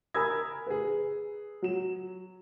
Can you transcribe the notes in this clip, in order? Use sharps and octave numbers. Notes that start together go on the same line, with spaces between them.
A#4 G#5 B5 D#6 E6 G#6
G#4 B4
F#3 E7